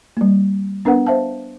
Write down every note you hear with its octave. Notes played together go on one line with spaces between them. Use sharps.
G3 A#3
B3 D4 A#4 B4 F#5
C5 E5 F5 A5